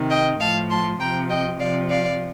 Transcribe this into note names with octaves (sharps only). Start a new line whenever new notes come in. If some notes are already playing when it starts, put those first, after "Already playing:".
Already playing: C3 D#3
D#5 G5
A2 F3 F5 A5
A5 C6
C3 F3 G5 A#5
D#5 G5
C3 F3 D5 F5
D5 F5